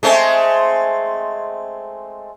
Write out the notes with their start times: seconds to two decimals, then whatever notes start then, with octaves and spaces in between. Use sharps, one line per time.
0.03 G#3 A3 C4